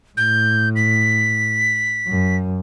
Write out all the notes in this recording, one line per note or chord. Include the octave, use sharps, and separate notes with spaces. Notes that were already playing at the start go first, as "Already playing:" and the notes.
A2 G6
B6
F#2